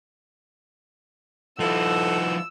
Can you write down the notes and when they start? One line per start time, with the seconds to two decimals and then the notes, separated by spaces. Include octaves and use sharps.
1.59 F3 D#4 E4 A4 F#5 E6